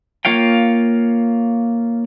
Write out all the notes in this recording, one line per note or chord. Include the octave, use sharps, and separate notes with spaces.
A#3 F4 C#5 F5 G5